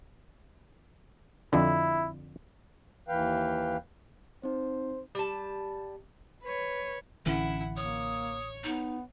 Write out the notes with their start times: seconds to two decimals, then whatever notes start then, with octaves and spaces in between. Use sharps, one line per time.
1.53 F2 D3 E4
3.09 D#2 E3 B4 F5 G5
4.43 C4 D#4 C5
5.15 G3 A5
6.43 B4 C#5
7.26 A1 D3 E3 C#4 E4 F#5
7.77 A#3 C#5 D#6
8.64 B3 D#4